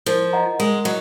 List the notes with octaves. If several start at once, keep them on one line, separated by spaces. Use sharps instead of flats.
F3 A#4
D#5 F#5 A#5
G#3 A#4
F#3 D#5